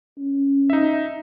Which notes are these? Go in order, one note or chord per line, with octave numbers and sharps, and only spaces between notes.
C#4
D#4 E5